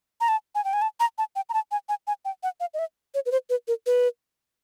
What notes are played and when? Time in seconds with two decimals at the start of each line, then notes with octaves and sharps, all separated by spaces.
0.21 A#5
0.28 A5
0.55 G#5
0.65 G5
0.73 G#5
0.82 A5
1.00 A#5
1.18 A5
1.36 G5
1.49 A#5
1.54 A5
1.71 G#5
1.89 G#5
2.07 G#5
2.25 G5
2.43 F#5
2.60 F5
2.74 D#5
2.79 E5
3.14 C#5
3.26 B4
3.32 C5
3.50 B4
3.68 A#4
3.86 B4